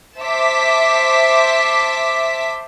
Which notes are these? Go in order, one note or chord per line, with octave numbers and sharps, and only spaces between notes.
C5 E5 A5 D6 B6